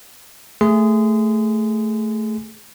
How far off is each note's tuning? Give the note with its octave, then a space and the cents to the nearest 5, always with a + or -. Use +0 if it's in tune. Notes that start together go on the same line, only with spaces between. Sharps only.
A3 +0 G#4 +0 C6 -30